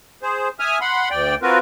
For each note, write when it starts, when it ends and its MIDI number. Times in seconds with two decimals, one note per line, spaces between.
0.23 0.49 68
0.23 0.49 72
0.59 0.78 76
0.59 0.78 80
0.59 0.78 87
0.59 0.78 89
0.81 1.09 78
0.81 1.09 83
0.81 1.09 84
1.11 1.35 38
1.11 1.35 74
1.11 1.35 79
1.42 1.59 60
1.42 1.59 65
1.42 1.59 66
1.42 1.59 70
1.42 1.59 71